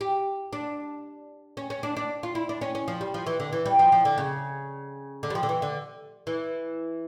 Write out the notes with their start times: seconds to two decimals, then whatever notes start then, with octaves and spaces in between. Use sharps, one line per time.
0.01 G4
0.53 D4
1.57 C#4
1.70 C#4
1.83 D4
1.97 D4
2.23 F4
2.35 E4
2.49 D4
2.61 C#4
2.75 C#4
2.88 F3
3.01 G3
3.14 F3
3.27 E3
3.40 D3
3.53 E3
3.66 G3
3.79 F3
3.92 F3
4.05 D3
4.18 C#3
5.23 D3
5.30 G3
5.35 F3
5.43 D3
5.49 E3
5.62 D3
6.27 E3